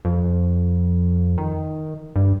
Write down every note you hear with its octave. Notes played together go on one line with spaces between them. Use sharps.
F2
D#3
G2